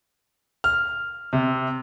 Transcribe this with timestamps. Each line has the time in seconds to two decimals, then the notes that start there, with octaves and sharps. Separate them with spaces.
0.64 F6
1.33 C3